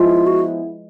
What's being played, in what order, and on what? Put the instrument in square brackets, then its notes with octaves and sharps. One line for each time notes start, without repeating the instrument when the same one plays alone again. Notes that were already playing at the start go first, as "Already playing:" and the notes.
Already playing: [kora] F3 G#3 B3 E4 [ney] F4
[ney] F#4